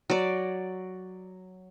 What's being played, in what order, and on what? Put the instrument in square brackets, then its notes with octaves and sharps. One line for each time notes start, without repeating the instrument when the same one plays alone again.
[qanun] F#3 D5